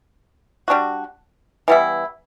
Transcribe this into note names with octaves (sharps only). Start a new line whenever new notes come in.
G3 D4 F#4
E3 G3 B3 E4